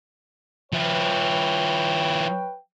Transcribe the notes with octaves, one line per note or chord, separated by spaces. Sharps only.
F3 E4 B4 C#5 G5